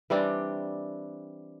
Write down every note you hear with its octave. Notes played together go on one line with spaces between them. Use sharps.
E3 G3 C4 D4